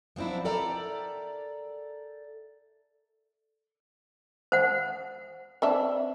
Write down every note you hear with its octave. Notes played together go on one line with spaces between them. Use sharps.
F3 F#3 C4 D4 E4
A4 A#4 D5 E5 G5 A#5
C5 F#5
C4 D4 E5